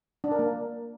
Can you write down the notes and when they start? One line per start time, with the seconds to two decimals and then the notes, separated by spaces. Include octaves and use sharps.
0.24 D4
0.31 A#4
0.39 A#3